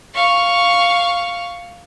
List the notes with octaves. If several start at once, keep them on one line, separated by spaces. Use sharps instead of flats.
F5 C#6